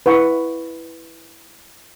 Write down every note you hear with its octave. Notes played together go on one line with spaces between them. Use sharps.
E4 B4 F#5 C#6